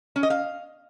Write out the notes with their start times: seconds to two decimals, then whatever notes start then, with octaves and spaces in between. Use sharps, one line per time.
0.16 C#4
0.23 D#5
0.30 F5